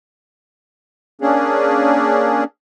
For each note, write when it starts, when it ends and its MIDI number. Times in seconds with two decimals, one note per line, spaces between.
1.21 2.44 58
1.21 2.44 61
1.21 2.44 62
1.21 2.44 68